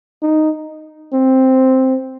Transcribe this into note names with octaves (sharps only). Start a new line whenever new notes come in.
D#4
C4